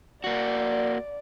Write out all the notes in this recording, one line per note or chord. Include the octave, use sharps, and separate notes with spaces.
A#3 F#4 D5